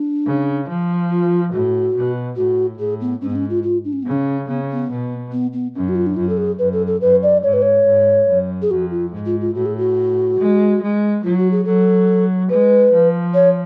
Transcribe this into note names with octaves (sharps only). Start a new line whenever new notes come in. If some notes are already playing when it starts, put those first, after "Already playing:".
Already playing: D4
C#3
F3
F4
A2 F#4
B2
A2 F#4
A2 G#4
B3
G#2 C#4
B3
C#4
F4
F4
D4
C#4
C#3 B3
C#4
C#3 B3
B3
B2
B3
B3
F#2 C#4
F#4
F4
D4
F#2 F4
A4
G#4
F#2 B4
A4
A4
F#2 B4
D5
G#2 C#5
B4
C#5
G#2
F#2
G#4
F2 F#4
F4
G#2
F4
F4
A2 F#4
G#4
F#4
G#3
G#3
F#3 F4
F#4
G#4
F#3 A4
G#3 B4
F3
C#5